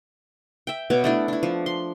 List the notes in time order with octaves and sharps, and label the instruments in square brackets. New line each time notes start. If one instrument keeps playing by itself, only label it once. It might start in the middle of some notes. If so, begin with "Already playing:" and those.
[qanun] E5 G5
B2 B3 C#5 D6
A3 D4 E4
D4 E4
F3
C6